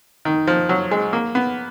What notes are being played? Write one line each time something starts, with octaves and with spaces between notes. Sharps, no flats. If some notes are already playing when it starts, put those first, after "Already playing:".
D#3
F3
F#3
G#3
A#3
B3